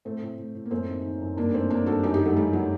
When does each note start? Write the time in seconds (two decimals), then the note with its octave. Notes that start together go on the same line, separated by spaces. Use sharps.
0.05 A2 A3 C4
0.22 A2
0.38 A2
0.55 A2
0.65 A#3
0.71 F#2 A3 C4
0.88 D#3
1.04 D#3
1.21 F#2
1.37 G2 A#3 D4
1.53 D#3 A3 C4
1.70 D#3 A#3 D4
1.86 G2 F#4 A4
2.03 F#2 D#4 G4
2.14 D#4 G4
2.19 D#3
2.25 F#3 A3
2.36 D#3 G3
2.53 F#3